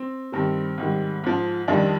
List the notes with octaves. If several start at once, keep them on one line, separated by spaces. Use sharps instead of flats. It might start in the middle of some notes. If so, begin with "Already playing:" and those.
Already playing: C4
G2 D#3 G3 C4
G#2 D#3 G3
G#2 F3
F2 D#3 G3 D4